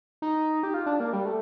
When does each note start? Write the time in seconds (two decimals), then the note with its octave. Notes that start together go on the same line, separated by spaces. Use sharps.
0.22 D#4
0.63 G4
0.74 F4
0.86 D4
1.00 A#3
1.13 G3
1.26 A3